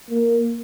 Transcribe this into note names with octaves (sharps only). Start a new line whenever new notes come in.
A#3